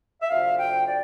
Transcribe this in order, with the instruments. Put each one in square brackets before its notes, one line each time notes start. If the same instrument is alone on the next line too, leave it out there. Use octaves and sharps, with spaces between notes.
[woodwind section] E5
D2 C3 F3 F5
G5
D5